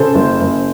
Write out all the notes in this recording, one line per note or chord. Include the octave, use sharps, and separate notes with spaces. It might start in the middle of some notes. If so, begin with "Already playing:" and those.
Already playing: C#3 A4 C5
F#1
F#1